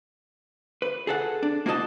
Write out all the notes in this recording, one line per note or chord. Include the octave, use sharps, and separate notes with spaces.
B4
G#4 A4 F#5
D4
A#3 E4 F#4 A4 D#5 A5